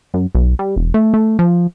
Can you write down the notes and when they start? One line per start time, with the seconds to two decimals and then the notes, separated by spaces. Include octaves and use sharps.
0.14 F#2
0.35 B1
0.59 G3
0.76 E1
0.94 A3
1.14 A3
1.39 F3